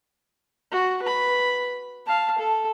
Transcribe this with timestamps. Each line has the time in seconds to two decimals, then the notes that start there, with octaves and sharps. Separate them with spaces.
0.72 F#4
1.02 B4 B5
2.06 F5 A5
2.39 A4